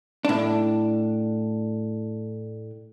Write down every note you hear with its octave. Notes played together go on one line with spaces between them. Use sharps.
A2 D4